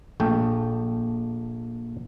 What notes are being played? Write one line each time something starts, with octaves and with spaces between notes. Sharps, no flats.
A#1 A3 G5